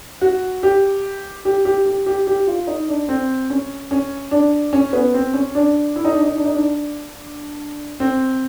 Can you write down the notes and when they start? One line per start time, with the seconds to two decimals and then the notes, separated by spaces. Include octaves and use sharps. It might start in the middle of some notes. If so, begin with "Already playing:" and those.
0.21 F#4
0.63 G4
1.45 G4
1.65 G4
1.86 G4
2.06 G4
2.27 G4
2.47 F4
2.67 D#4
2.89 D4
3.09 C4
3.50 C#4
3.91 C#4
4.31 D4
4.73 C#4
4.93 B3
5.14 C4
5.34 C#4
5.55 D4
5.96 E4
6.05 D#4
6.14 D4
6.23 D#4
6.37 D4
6.45 D#4
6.54 D4
8.00 C4